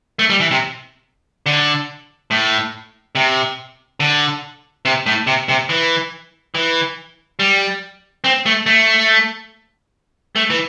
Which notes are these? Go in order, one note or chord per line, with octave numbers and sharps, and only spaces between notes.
A3
G3
E3
C3
D3
A2
C3
D3
C3
A2
C3
C3
E3
E3
G3
C4
A3
A3
A3
E3